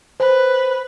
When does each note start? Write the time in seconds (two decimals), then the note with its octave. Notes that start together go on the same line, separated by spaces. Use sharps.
0.20 B4 C5